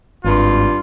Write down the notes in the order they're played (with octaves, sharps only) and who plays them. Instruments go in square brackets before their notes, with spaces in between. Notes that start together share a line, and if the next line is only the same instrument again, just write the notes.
[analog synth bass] G#1 [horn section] G2 F4